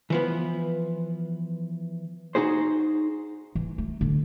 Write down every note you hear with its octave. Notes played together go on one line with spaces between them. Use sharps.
E3 F3 B3
D#4 F#4 G#4 C5
E3
A3
D3